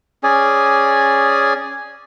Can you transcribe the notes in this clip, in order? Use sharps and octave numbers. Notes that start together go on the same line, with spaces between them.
C#4 G#4 D5 G#5